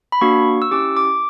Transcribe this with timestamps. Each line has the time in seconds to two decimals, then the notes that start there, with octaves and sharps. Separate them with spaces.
0.12 B5
0.21 A#3 D4 F#4 C#6
0.62 E6
0.71 C#4 E4 G4 D6
0.97 D6